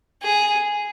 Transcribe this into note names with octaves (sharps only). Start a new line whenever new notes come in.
G#4